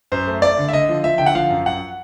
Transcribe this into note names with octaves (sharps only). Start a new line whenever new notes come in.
F#2 C5
A3
A3 D5
D3
E5
D3 D#5
F3
F3 E5
D3 G5
F#5
F3 F5
F#2
F#2 F#5